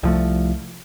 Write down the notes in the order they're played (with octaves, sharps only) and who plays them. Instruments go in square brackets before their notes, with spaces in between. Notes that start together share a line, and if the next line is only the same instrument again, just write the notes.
[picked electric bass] C2 F3 A3